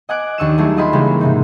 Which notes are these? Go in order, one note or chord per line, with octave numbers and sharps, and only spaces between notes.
D#5 F#5 G#5 D6 F#6 D7
D#2 D4 C#6 E6 D#7 E7
F#3 G3 A3 E4 G#4
F4 G#4 D#5 G5 B5 C6
C#3 E3 G3 G#3 A#3
G#2 C3 D#4